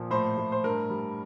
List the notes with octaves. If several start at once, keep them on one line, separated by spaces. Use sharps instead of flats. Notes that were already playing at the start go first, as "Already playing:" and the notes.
Already playing: A#2 F3
A2 C5
A2
C5
G2 A#4
G3